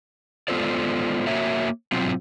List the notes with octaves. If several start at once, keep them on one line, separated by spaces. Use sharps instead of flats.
G#3 B3 F4 A4 C5 D5
A#3 F#4 A#4 C#5 E5
G#2 B2 F#3 C4 F4